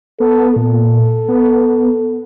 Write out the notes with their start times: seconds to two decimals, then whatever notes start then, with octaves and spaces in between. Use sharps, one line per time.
0.20 B3 A4
0.56 A#2 A4
1.28 B3